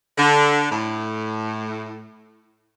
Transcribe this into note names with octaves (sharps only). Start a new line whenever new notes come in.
D3
A2